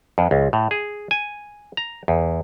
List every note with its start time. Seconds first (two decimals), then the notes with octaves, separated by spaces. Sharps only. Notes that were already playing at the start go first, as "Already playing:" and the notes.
0.18 F2
0.31 C#2
0.53 A2
0.71 G#4
1.11 G#5
1.77 A#5
2.08 E2